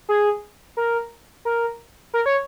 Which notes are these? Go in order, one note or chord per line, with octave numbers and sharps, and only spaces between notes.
G#4
A#4
A#4
A#4
C#5